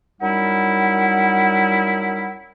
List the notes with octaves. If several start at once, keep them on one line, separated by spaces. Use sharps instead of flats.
F#2 G3 D#4 E4 F#5